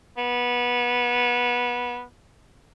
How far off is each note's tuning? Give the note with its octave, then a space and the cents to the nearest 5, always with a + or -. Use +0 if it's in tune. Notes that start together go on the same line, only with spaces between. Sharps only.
B3 -20